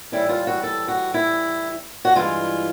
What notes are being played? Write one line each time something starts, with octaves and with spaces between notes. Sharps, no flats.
A2 E3 G3 E4
F4
F#4
A4
F#4
E4
F#4
G2 E3 G#3 F4